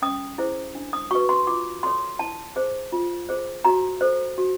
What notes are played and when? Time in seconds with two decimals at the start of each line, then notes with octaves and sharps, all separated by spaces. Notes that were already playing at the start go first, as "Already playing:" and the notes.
0.02 C#4 D#6
0.38 E4 G#4 C5
0.75 D4
0.93 D#6
1.11 F#4 B4 C#6
1.29 C6
1.47 F4 D6
1.83 A4 C#5 C6
2.19 E4 A5
2.56 G#4 C5
2.92 F4
3.29 G#4 C5
3.65 F#4 A#5
4.01 A4 C5
4.38 F#4